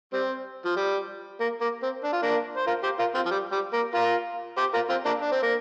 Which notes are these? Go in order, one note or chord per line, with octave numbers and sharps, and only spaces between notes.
G3 C4
F3
G3
A#3
A#3
C4
D4
F4
A#3 D4
C5
F4 A#4
G4 C5
F4 A#4
C4 F4
F3
G3
G3
A#3
F4 A#4
G4 C5
F4 A#4
C4 F4
A#3 D4
D4
C4
A#3